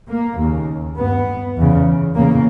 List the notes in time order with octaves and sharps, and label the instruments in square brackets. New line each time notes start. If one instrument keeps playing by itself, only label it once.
[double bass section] A#3
D#2 C#3
G2 B3
E2 C#3
E2 C#3 A#3